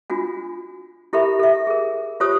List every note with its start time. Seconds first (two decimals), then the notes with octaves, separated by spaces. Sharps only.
0.10 D4 F4 F#4 G#5
1.13 E4 G4 A4 A#4 E5 B5
1.40 A4 E5
1.67 G#4 A#4
2.20 F4 G4 C5 C#5 A5 D#6